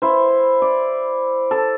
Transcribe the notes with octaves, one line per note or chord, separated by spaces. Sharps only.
E4 C5
D5
A4